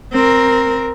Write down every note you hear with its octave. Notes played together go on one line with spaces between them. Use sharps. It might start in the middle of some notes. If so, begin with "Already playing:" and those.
C4 A#4